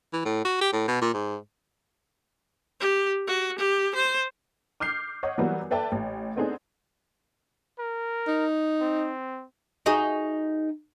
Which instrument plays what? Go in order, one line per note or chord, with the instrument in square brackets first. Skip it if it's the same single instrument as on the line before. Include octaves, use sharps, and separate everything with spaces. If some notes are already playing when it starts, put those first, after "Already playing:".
[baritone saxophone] E3
A2
F#4
G4
A2
B2
A#2
G#2
[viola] G4
F#4
G4
C5
[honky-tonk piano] D6 F6 G6 C7
C#5 D#5 F#5
E3 F#3 G3 B3 F#4 A#4
A4 B4 D5 E5 G5 A5
A1
A3 B3 C4 D4 D#4 G#4
[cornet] A#4
[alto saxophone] D#4
[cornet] C4
[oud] D#4 F#4 G#4